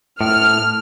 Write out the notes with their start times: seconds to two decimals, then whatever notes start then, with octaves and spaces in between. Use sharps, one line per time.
0.21 A2 F6